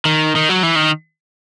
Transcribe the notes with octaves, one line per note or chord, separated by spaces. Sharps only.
D#3
D#3
F#3
E3
D#3